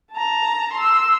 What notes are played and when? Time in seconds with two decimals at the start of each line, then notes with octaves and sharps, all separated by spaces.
0.13 A5 A#5
0.73 C6 E6